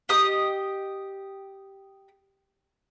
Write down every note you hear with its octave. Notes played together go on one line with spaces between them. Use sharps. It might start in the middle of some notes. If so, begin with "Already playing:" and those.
G4 D#5 D#6